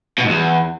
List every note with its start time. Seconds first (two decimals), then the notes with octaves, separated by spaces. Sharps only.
0.18 B2
0.24 G#2
0.29 E2